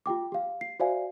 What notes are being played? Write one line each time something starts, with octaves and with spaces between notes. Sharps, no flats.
F4 G4 G5 D6
G4 F5
C7
F#4 C5 D5 E5 F5 G#5